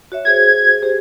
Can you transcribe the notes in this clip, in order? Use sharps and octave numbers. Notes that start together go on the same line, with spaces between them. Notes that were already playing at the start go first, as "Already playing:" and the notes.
F#4 C#5 E5
F#4 G#4 C5 G#6
G4 G#4 C5